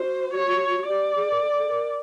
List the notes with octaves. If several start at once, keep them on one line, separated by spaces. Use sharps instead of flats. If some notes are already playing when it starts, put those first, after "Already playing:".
Already playing: F#4 C5
C#5
G4 D5
G#4
A#4
A4
A4
A#4